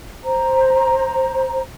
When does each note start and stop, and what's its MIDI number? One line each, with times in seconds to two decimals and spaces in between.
0.25 1.61 72
0.25 1.61 82